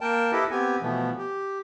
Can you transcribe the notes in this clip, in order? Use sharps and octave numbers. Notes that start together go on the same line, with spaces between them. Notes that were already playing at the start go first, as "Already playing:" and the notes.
A#3 A#4 G5 A5
E4 G4 A4 B4 D#5
B3 C4 G4 G#5
B2 E3 F3 A3 B3
G4